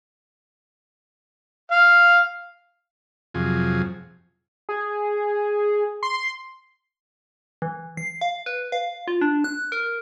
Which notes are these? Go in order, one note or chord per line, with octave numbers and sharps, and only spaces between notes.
F5
F2 C3 F3 F#3 G#4
G#4
C6
E3
C7
F5
B4
F5
F4
D4
F#6
A#4